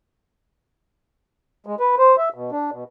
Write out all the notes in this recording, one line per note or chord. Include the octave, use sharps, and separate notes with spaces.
G#3
B4
C5
E5
B2
D4
B2